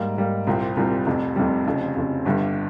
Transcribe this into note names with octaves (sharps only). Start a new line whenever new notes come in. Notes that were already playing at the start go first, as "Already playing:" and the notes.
Already playing: G#2 G3 A#3
G#2 G3 A#3
C2 A#2 G3 C4
C2 A#2 G3 C4
F1 F2 C3 G3
F1 F2 C3 G3
F1 F2 C#3
F1 F2 C#3
G1 G2 G3